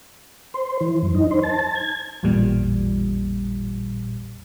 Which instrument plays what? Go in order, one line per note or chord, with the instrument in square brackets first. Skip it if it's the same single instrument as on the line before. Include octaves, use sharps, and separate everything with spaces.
[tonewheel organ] C5
E3
F#2
D#4
C5
A5
G#6
[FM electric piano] A1 E2 A#2 G3